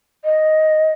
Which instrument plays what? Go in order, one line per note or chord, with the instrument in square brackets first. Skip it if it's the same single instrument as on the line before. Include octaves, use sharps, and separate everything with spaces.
[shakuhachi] D#5